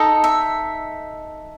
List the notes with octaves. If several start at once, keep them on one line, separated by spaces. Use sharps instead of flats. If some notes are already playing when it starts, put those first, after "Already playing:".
Already playing: D#4 A4 D#5
E5